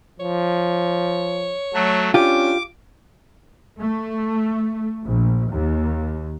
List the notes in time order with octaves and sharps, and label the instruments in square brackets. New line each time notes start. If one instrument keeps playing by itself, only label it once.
[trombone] F3 [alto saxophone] C#5
[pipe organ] F#3 A3
[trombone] C#4 [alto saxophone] D4 [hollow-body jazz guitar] F4 G4 [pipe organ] D6
[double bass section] A3
A#1
D#2